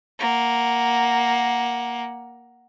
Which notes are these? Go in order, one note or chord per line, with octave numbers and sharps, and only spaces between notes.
A#3 F#5